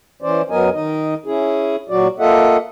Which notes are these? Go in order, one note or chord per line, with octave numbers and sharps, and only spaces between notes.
E3 C#4 C5 D5
F#2 F#3 B3 A#4 D#5 G#5
D#3 D#4 D#5
C#4 E4 G#4
A#2 F#3 F#4 D5
A#3 F4 A4 D#5 E5 F#5